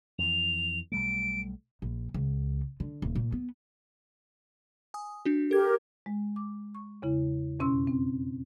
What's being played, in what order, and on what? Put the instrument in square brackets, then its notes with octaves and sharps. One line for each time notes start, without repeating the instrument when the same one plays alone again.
[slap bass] F2 E3 [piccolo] F7
[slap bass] B1 G3 A3 [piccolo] D7
[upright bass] A#1
C#2
D3
D#1
A#2
B3
[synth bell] G#5 D#6
D4 F#4
[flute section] G4 A#4 [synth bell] A4 G#6
[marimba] G#3
D6
C#6
E2 C#3 E4
F2 B2 C#4 C6 E6
C4